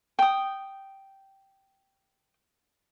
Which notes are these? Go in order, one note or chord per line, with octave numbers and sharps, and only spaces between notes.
G5 D#6